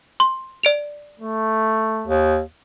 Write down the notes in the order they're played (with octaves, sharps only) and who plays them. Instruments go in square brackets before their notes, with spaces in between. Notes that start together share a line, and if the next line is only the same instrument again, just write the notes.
[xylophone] C6
D5 D7 F7
[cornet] A3
[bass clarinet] D#2